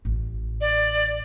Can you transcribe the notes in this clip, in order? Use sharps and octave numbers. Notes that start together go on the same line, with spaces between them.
A1
D5